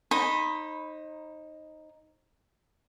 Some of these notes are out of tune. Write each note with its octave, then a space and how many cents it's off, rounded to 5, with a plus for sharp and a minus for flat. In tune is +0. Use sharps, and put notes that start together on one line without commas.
D#4 +0 C5 +35 B5 +0